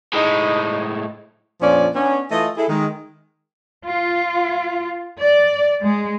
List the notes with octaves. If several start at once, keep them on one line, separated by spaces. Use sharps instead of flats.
A2 G#3 D#4
F2 A#2 F3 C#4 D4 D5
B3 C#4 D4
E3 A3 F4 D#5
E4 G#4 A4
D#3 G#3
F4
D5
G#3